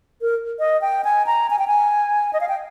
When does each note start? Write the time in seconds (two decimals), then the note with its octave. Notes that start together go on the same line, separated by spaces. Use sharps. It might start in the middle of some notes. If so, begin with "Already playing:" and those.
0.21 A#4
0.59 D#5
0.81 G5
1.04 G#5
1.27 A#5
1.50 G#5
1.59 G5
1.68 G#5
2.33 D#5
2.41 F5
2.49 G5